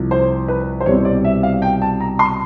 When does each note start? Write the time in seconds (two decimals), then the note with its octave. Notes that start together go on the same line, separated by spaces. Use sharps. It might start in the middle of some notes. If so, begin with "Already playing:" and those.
Already playing: C2 C3 F3
0.11 C5
0.48 B4
0.81 C5
0.86 C2 B2 G3 C4 C#5
1.05 D5
1.24 E5
1.43 F5
1.62 G5
1.82 A5
2.00 A#5
2.19 C6